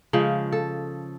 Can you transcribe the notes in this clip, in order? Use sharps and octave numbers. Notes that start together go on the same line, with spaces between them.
C#3 F3 G#3
A4